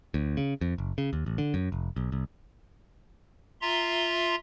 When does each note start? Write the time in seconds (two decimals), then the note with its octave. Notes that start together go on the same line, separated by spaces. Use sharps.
0.14 D2
0.37 C#3
0.61 F2
0.78 F#1
0.98 C#3
1.13 D#2
1.26 A1
1.38 D3
1.54 F#2
1.72 F1
1.96 B1
2.12 C2
3.61 F4 E5 A#5 C6